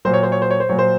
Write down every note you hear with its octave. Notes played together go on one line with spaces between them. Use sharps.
A#2 F#3 C5
C#5
C5
C#5
C5
C#5
C5
A#2 F#3 C#5
C5